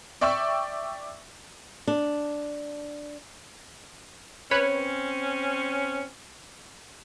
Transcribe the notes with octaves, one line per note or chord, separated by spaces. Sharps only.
D5 E5 G5 C#6 D6 E6
D4
C4 C#4 B4 C#5 B5